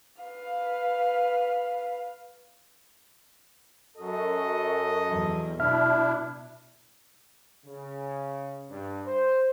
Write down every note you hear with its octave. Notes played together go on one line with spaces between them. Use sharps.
B4 F5
F#2 A4 D#5
E2 F#3
B2 D4 E4 E5 F6
C#3
G2
C5